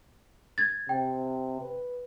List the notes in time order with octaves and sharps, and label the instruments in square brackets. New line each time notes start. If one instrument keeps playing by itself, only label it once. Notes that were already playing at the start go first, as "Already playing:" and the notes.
[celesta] G#6 A6
[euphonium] C3 [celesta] G5
[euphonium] B4